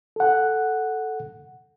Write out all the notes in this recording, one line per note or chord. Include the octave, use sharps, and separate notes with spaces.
A4 F#5